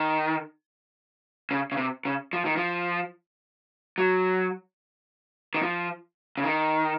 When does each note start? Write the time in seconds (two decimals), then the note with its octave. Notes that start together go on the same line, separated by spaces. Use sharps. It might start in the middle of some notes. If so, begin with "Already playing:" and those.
Already playing: D#3
1.51 C#3
1.72 C#3
1.77 C3
2.05 C#3
2.33 F3
2.45 D#3
2.57 F3
3.98 F#3
5.54 D#3
5.62 F3
6.37 C#3
6.44 D#3